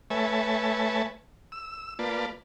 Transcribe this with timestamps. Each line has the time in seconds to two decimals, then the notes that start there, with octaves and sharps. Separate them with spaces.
0.10 A3 B4 C#5 E5 G#5 A5
1.52 E6
1.99 A#3 F4 B4 D5 A5